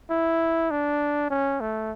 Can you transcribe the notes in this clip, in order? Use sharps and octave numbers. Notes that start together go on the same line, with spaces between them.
E4
D4
C#4
A3